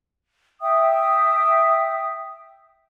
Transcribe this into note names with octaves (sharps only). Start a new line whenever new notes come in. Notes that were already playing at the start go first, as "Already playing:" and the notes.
E5 G5 D#6